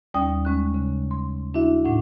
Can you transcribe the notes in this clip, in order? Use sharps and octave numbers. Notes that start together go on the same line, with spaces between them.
D#2 G3 C#4 D5 G5 D#6
G#3 C#4 F#6
C#3
C6
D4 E4 F#4 E5
A2 D4 D#4 F#5